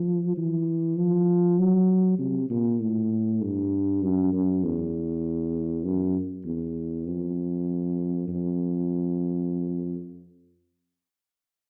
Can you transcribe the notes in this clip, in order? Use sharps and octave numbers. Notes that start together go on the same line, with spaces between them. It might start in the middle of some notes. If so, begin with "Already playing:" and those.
Already playing: F3
E3
F3
F#3
C3
A#2
A2
G2
F#2
F#2
E2
F#2
E2
F2
F2